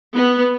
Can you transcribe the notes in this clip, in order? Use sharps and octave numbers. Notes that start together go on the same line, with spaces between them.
B3